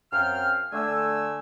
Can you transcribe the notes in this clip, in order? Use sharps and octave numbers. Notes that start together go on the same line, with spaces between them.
F#2 C4 F5 G5 F6
D3 A3 G#5 E6